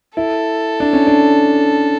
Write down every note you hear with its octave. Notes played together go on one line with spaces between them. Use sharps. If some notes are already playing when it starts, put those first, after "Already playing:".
E4 A4
D4
C#4
D4